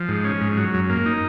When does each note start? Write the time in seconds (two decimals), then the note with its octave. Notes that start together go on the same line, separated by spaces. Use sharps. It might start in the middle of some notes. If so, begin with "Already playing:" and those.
Already playing: F3
0.08 G#2
0.24 C#4
0.41 G#2
0.57 F#3
0.74 F#2
0.90 A#3
1.06 D#4